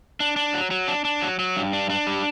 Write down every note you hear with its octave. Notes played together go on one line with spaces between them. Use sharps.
D4
D4
F#3
F#3
D4
D4
F#3
F#3
G2
D4
D4
G3